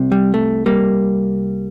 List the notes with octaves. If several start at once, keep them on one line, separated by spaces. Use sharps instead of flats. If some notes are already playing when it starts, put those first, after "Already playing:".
Already playing: C2 C3
G3
A3
G3 A#3